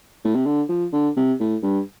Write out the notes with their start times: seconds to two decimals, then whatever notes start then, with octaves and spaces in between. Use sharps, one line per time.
0.25 A2
0.35 C3
0.46 D3
0.69 F3
0.92 D3
1.16 C3
1.40 A2
1.63 G2